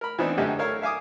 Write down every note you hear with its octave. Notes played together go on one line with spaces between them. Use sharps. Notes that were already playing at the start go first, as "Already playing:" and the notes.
A#4 B5
E3 B3 C4 D4 D#4
F#2 D3 G4 D#5 E5 F#5
A4 A#4 C#5 F5
E5 F5 G#5 D6 D#6